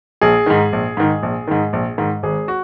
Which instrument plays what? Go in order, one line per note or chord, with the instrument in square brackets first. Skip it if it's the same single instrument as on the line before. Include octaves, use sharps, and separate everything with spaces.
[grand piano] A#1 G#4
G#2 D#3
A#1
G#2 D#3
A#1
G#2 D#3
A#1
G#2 D#3
G#1 G#4
F#4